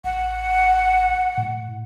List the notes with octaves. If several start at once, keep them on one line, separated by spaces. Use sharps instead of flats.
A1 F#5
A2